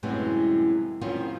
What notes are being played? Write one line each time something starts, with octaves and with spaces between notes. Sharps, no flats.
F#2 A2 C3 E3 G3 G#3
D#3 F3 G3 C4 C#4 F4